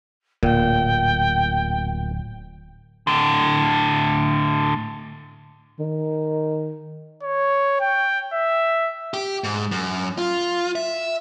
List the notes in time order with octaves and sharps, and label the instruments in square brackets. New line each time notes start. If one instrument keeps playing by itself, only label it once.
[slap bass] D1 [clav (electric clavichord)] A#2 [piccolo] G5
[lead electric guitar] A2 D3
[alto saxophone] D#3
[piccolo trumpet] C#5
G5
E5
[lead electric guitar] G4
G#2
F#2
F4
E5